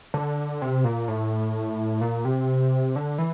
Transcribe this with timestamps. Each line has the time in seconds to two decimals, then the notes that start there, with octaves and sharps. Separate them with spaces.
0.14 D3
0.62 C3
0.84 A#2
1.08 A2
2.01 A#2
2.25 C3
2.96 D3
3.18 E3